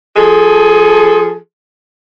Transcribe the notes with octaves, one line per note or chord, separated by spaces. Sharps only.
F3 G#4 A4